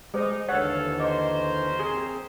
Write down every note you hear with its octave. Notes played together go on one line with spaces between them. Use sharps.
G#3 D#4 G#4 C5
D#2 D3 E3 A4 C#5 F5 F#5
C#4 A#4 C5 D#5 D6
C4 G#4